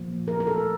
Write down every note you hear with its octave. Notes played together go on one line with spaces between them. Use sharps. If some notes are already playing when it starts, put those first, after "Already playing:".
Already playing: A#2 F3 A#3
A#4
A#4
A4